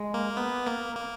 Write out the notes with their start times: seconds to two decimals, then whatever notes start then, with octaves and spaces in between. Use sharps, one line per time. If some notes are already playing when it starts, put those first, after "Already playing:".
Already playing: G#3
0.14 A#3
0.37 B3
0.67 A#3
0.96 A#3